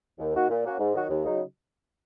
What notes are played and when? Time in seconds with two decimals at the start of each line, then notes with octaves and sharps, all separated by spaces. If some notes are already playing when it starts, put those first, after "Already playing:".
0.18 D#2
0.34 D#3 A#3 F#4
0.49 A#2
0.64 A#3 C#4 F#4
0.79 G#2
0.94 D#3 F#3 D#4 F#4
1.09 D#2
1.24 C#3 F#3 D#4